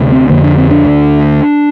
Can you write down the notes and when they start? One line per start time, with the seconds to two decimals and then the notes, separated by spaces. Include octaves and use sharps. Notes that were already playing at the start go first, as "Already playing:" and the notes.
Already playing: D2 C3
0.12 C4
0.29 F2 D3 A#3
0.44 D4
0.58 C4
0.71 D4
0.84 D2 D3